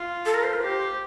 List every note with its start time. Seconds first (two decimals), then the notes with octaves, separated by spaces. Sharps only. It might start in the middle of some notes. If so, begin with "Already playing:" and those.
Already playing: F4
0.26 A4
0.34 A#4
0.43 C5
0.53 A#4
0.62 G4 C5